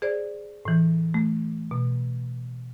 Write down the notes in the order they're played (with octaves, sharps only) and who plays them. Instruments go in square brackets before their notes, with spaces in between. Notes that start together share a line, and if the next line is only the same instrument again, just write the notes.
[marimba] G#4 C5 D5
A2 E3
A3
B2